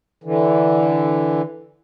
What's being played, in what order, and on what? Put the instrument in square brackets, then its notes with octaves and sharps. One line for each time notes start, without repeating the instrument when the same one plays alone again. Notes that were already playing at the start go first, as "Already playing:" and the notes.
[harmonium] D3 E3